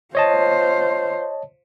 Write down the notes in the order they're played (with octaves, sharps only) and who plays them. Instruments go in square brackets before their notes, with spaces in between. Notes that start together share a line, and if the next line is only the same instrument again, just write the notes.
[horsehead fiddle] F4 C5 [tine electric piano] C#5 D#5 A5